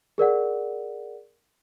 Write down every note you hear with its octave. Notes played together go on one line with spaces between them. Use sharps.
G#4 A#4 D5 F#5